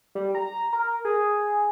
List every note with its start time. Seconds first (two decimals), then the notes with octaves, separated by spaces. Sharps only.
0.15 G3
0.35 A#5
0.73 A#4
1.05 G#4